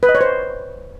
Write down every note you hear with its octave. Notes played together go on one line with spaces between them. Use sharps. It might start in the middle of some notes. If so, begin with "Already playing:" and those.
B4
D#5
C#5
C5